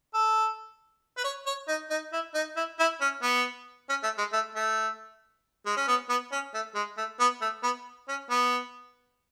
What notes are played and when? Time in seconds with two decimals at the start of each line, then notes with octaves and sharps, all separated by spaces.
0.14 A4
1.18 B4
1.24 C#5
1.46 C#5
1.68 D#4
1.90 D#4
2.13 E4
2.34 D#4
2.56 E4
2.79 E4
3.01 C#4
3.22 B3
3.89 C#4
4.03 A3
4.18 G#3
4.32 A3
4.55 A3
5.66 G#3
5.76 C#4
5.88 B3
6.09 B3
6.32 C#4
6.54 A3
6.75 G#3
6.98 A3
7.20 B3
7.42 A3
7.63 B3
8.08 C#4
8.30 B3